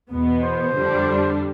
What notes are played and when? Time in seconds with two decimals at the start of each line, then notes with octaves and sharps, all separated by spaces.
0.12 E2 B2 B3
0.43 C5
0.75 F2 D3 G3 D4